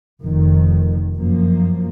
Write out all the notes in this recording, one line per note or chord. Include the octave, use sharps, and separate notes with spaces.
F1 F2 D#3
F#2 F3 A#3